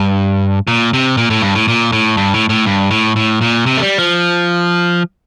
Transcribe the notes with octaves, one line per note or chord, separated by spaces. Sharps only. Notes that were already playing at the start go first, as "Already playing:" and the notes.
Already playing: G2
A#2
C3
A#2
A2
G2
A2
A#2
A2
G2
A2
A2
G2
A2
A2
A#2
C3
A3
G3
F3